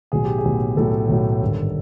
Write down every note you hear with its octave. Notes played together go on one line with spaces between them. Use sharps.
B1 A2 F#3 G#4
G4
G#4
B1 A2 F#3
B1 A2 F#3 A4
B1 A2 F#3
G#1 G2 D3